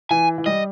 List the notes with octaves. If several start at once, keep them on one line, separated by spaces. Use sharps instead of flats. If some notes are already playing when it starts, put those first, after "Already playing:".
E3 G#5
E3
G3 D#5